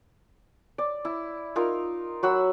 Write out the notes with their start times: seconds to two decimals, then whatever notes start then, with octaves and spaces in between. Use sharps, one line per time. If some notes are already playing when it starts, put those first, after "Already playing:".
0.78 D5
1.05 E4
1.56 D#4 F4 A#4
2.23 F#3 F#4 B5 E6